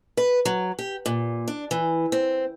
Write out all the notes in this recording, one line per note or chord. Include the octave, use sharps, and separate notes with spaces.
B4
F#3
G4
A#2
D4
E3
C4